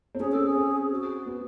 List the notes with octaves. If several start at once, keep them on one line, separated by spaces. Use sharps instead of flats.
C4
C#4 G#4
A4
G#4
C4
F#4
B3